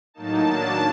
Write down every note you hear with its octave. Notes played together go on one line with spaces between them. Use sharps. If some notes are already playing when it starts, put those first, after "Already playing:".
A2 F#3 A#3 D#4 A5
D#3 F#3 A#3 D4